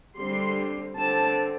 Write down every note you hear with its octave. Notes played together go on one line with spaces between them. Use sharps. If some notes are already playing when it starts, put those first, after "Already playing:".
D3 G3 C4 C6
D3 C4 A5